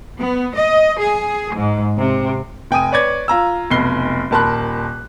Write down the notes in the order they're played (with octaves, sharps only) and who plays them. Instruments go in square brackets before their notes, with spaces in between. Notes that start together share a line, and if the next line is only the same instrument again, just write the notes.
[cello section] B3
D#5
G#4
G#2
C3
[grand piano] F1 G5 G#5 D#6 D#7
B4 C#5 D5 G#6
F4 A#5 E6
F1 B1 B5 C7 G7
D#1 A#4 A5 B5 C6 F#6